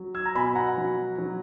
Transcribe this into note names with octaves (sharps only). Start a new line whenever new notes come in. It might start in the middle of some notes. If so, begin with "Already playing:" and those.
Already playing: F#3
E6 G#6
A#5
B2 G#5 B5
F#5 A#5
F#3
F#3